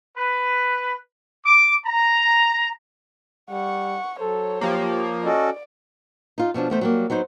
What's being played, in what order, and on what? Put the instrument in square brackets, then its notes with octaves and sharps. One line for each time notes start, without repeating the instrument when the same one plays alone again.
[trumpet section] B4
D6
A#5
[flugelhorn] G3 [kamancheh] F#5 C#6
[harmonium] F#3 [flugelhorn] A4 [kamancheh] C5 C#5
[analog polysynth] F3 A#3 [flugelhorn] G4
[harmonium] C#4 F#4 A4 [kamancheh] D5 [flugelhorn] D#5
[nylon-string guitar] D#4 F4
B2 F3 C#4 D4
E2 A3 C5
F#3 G3 A#3
F#3 B3 D#4 C5